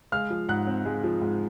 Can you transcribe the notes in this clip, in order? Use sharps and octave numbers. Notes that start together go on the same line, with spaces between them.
G#3 F5 F6
F3
G#2 F#5 F#6
C4
G#3
F3
G#2